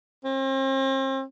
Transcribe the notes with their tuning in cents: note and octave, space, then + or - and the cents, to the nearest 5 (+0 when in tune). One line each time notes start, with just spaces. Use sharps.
C4 +40